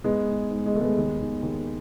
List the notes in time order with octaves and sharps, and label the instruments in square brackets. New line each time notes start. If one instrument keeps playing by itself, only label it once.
[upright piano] G#2 G#3 B3
G#2
G#2
G#3
D#3 A3
G#3 B3
D#2
D#2
D#2